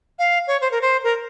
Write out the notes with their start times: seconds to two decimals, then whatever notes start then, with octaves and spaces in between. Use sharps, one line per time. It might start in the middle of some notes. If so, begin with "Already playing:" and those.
0.19 F5
0.47 C#5
0.61 C5
0.71 A#4
0.81 C5
1.04 A#4